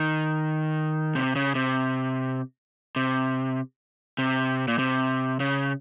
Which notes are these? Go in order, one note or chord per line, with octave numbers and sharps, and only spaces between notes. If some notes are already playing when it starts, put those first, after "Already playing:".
Already playing: D#3
C3
C#3
C3
C3
C3
A#2
C3
C#3